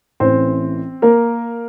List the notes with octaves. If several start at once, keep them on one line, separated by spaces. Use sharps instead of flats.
A1 A2 E3 C4 C5
A#3 A#4